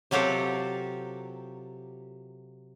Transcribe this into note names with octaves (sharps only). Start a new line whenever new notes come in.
C3 F#3 F4 G4 A4 A#4